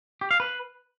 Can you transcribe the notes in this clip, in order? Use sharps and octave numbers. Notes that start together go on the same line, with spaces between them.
G4
F5
B4